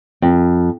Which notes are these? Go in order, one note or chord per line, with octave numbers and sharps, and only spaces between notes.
F2